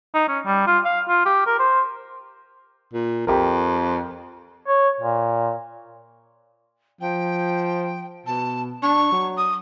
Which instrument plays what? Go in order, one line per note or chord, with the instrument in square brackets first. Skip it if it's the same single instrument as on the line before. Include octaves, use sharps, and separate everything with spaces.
[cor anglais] D#4
C#4
G3
F4
F5
F4
G4
A#4
C5
[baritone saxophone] A#2
[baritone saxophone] F2 [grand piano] G4 A#4
[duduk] C#5
A#2
[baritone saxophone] F3 [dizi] G5
[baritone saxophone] B2 [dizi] A5
[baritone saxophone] D4 [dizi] C#6
[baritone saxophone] F#3
[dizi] D#6